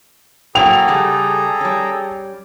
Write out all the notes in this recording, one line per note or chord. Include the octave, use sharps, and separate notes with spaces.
F#3 A#3 F#4 G#4 A4 G5 A#5 F7
C#3 G3 A3
G3 C#4